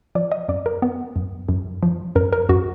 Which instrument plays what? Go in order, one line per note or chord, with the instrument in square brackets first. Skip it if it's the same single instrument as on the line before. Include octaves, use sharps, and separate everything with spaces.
[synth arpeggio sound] F3 D5
D#5
F#2 D5
A#4
B3
F#2
F#2
F3
F#2 A#4
A#4
F#2 F#4